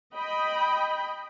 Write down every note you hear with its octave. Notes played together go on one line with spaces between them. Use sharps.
D#5 G5 B5